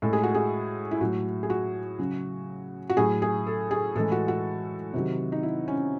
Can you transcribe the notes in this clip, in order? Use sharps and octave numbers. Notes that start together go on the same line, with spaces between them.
A2 G#3 A4
G#4
F#4
G#4
E4
A2 F#3 F#4
G#4
F#4
C#3 F#3
F#4
A2 F#3 G#4
G#4
A4
G#4
A2 E3 G#3 A4
F#4
F#4
C3 D#3 F#3
D#4
E4
C#4